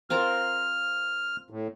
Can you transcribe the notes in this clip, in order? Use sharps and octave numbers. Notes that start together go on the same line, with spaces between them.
C4 F4 A#4 F6
A2